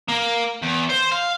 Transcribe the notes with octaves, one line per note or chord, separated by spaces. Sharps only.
A#3
E2
C5
F5